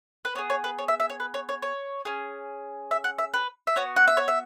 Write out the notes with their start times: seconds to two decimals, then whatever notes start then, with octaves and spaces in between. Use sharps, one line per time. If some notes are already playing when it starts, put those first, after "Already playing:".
0.25 B4
0.35 B3 C#5
0.38 G#4
0.50 C#5
0.64 B4
0.78 C#5
0.88 E5
1.00 E5
1.10 C#5
1.20 B4
1.34 C#5
1.49 C#5
1.62 C#5
2.05 C#4 G#4
2.91 E5
3.04 F#5
3.19 E5
3.34 B4
3.67 E5
3.76 B3 F#4 C#5
3.96 F#5
4.07 E5
4.17 C#5
4.28 E5